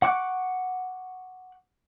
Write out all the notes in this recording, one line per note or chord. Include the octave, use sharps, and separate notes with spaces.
F#5 C#6 D6 F#6